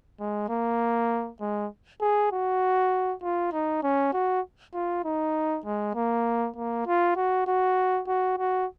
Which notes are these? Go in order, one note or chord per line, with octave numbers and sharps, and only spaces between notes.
G#3
A#3
G#3
G#4
F#4
F4
D#4
C#4
F#4
F4
D#4
G#3
A#3
A#3
F4
F#4
F#4
F#4
F#4